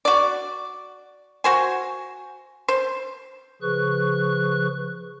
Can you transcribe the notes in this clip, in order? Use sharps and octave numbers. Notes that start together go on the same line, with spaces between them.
F#4 D5
F#4 C5 G#5
C5
C#3 F3 G#4 B4 C#6 F#6